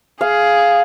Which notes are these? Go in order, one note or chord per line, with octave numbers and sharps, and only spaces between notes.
G#4 F5